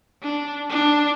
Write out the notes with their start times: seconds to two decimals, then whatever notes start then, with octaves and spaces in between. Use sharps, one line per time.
0.23 D4
0.70 D4